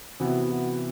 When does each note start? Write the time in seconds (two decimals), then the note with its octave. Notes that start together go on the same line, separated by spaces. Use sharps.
0.20 C3 E3 B3 E4 F#4
0.50 F#4